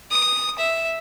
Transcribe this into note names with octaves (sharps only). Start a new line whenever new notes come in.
D#6
E5